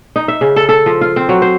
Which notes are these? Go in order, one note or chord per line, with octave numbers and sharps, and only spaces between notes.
D#4
E5
C#3
A4
A4
F3
F4
C4
F#3
C5